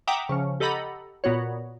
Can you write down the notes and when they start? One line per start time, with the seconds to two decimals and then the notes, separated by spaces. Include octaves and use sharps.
0.07 E5 F#5 G5 A#5 D6 D#6
0.29 C#3 F3 C#4
0.60 G4 A4 D#5 F#5 A#5 B5
1.24 A#2 B3 F#4 C#5